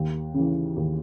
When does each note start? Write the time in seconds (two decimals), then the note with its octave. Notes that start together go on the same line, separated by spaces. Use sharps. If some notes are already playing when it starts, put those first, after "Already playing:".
Already playing: D#2
0.34 C#3
0.39 E3
0.76 D#2